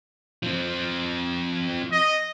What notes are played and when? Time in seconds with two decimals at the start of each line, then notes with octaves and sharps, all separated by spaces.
0.43 F3 C4
1.92 D#5